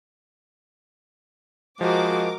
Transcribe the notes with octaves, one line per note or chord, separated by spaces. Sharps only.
F3 G#3 F#4 A#4 C5 D#5 D6